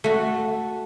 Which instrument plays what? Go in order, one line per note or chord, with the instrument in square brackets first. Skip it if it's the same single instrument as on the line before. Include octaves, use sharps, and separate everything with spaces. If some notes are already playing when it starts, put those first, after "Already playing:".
[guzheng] A3 F#4